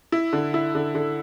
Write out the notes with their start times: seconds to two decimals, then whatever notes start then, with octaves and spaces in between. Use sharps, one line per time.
0.12 E4
0.33 D3
0.54 E4
0.75 D3
0.95 D3